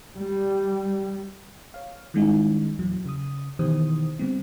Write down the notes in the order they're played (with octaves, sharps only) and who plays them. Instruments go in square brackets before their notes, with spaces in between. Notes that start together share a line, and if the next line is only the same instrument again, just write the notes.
[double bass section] G3
[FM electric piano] C#5 F5
D#3 G3 G#3 C#4 D#4 E4
E2 A#2 E3 F#3
C#3 D#6
B2 D#3 E3 G4 C5 D#6
D3 G3 B3 C4